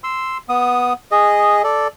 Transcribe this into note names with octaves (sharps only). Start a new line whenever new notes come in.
C6 E6
B3 D#6
G#4 D#5
A4 D5